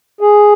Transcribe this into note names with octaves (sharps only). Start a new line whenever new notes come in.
G#4